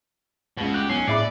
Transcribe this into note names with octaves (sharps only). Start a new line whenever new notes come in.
C#2 B2 F#5
G4 F#6
B1 C#4 C7
A2 G#4 D5 E5 B5 D6